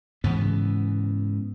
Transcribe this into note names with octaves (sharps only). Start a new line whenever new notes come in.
G#2 C#3 E3 B3